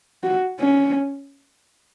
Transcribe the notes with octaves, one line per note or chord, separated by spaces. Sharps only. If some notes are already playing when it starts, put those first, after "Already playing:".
F#4
C#4